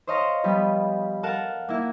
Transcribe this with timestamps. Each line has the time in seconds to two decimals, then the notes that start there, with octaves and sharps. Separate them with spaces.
0.07 C5 C#5 D#5 F5 A#5
0.44 F3 G3 B3 D#5
1.23 A4 A#4 F5 F#5 E7
1.69 A#3 E4